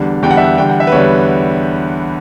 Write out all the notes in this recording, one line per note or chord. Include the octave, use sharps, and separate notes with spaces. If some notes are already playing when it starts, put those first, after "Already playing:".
Already playing: E2 D3 G3
E2 D3 G3 G5
F#5
E5
F#5
E2 D3 G3 G5
F#5
E5
B4
E2 D3 G3 C#5